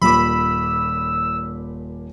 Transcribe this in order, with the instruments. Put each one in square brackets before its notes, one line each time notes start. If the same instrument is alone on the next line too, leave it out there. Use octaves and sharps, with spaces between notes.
[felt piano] D#1 A#2 D6 [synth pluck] B5 [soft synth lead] E6